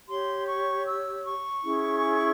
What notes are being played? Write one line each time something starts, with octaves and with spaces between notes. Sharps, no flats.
G4 C#5 C6
C#6
E6
C#6
C#4 E4 G#4